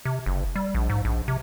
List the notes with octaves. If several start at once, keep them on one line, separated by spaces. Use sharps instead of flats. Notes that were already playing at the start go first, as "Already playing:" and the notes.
C3
F#1
G3
A#1
G#2
A#1
C3